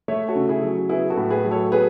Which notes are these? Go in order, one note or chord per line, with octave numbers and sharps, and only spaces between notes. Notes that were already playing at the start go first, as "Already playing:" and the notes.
A3 C#5 E5
F#4 A4
C#3
E4 G#4
F#3
B3 E4 G#4
F#4 A4
A2
G#4 B4
F#3
A4 C#5
B3 G#4 B4